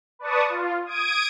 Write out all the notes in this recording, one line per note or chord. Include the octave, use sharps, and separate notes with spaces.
B4 D5 A5 C#6 D#6
F4
D#6 G#6 D7 D#7